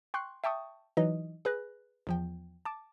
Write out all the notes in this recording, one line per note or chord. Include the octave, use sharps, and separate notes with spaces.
G5 C6 C#6 F#6
E5 G5 A5 C#6 D#6
E3 F#3 D#4 D#5
G#4 B4 F#6 A#6
E2 F3 G5
A5 D6